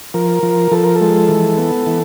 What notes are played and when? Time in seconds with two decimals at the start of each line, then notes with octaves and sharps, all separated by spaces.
0.14 F3 A#4
0.43 F3
0.72 F3 A4
0.84 A#4
0.96 G#3 A4
1.29 E3
1.57 B3
1.87 E3